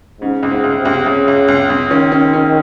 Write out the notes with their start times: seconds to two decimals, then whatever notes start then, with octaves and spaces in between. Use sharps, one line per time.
0.21 G#2 C#3
0.43 C#2
0.50 G#2
0.64 C#2
0.78 C3
0.85 C#2
1.06 C#2 C#3
1.28 C#2
1.48 C#2
1.70 C#2
1.91 D#3 C#4
2.12 C#4
2.33 C#4